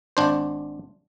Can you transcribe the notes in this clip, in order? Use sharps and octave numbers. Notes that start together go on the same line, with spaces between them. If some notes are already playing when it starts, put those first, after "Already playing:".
G#1 D4 C5